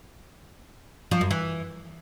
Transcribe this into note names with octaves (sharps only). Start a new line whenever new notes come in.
F3
F#2
E3